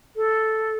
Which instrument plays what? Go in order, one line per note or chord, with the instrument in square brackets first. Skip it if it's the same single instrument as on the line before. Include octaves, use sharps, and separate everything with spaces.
[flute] A4